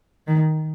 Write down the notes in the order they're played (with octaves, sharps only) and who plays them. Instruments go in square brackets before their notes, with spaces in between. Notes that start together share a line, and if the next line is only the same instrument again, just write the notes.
[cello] D#3